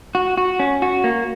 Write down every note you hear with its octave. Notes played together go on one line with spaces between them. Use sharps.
F#4
F#4
C#4
F#4
A#3